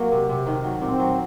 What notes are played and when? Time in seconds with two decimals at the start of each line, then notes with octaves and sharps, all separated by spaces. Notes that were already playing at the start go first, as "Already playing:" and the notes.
Already playing: F#3 A#3
0.12 C3
0.29 C3
0.47 D#3
0.64 F#3
0.81 A#2 C4
1.00 F#3